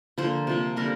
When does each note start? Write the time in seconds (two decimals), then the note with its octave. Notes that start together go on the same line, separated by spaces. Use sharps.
0.18 D3 F3 A#3 C5
0.47 C3 F3 A#3
0.76 D3 G3 A#3 A#4